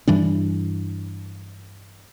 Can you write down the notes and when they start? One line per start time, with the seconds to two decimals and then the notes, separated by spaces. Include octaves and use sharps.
0.08 G2 E3 G3 D4